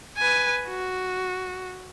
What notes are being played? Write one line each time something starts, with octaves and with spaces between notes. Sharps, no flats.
B4 G#5
F#4